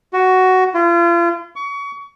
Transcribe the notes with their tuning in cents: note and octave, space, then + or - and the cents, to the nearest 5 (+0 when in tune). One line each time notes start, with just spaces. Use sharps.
F#4 +10
F4 -35
C#6 +30